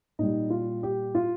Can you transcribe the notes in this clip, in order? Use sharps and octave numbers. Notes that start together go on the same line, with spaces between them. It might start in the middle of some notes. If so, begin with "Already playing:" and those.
A#2 G3 D#4
F4
G4
F4